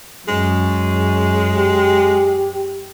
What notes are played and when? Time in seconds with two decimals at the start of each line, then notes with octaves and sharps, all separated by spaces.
0.28 F#2 G#3
1.57 G4